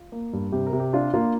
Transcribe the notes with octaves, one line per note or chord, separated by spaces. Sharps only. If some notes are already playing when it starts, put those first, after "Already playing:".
Already playing: F4
A#3
G2
C3 G4
A#4
C3
G4
D4 F4
A#3 F4